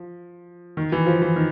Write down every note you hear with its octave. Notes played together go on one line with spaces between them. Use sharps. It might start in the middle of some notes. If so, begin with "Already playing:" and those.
Already playing: F3
D#3
E3
F3
E3
D#3